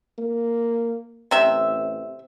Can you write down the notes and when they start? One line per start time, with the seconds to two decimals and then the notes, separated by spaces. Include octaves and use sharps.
0.18 A#3
1.31 A1 C3 E5